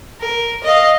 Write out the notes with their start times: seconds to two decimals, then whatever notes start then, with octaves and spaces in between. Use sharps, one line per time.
0.21 A#4
0.64 D#5 F5